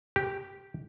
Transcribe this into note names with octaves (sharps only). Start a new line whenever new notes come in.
G4